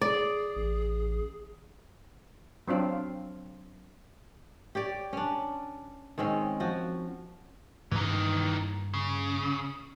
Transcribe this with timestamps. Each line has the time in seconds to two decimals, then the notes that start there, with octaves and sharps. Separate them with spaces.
0.01 G#4 D5
0.56 A1
2.68 F#3 C4 D4 F4
4.75 G4 C#5 D5
5.13 C#4 D4
6.18 D#3 G#3 C4 C#4
6.60 F3 F#4
7.92 G2 D#3 E3 A#3
8.94 C#3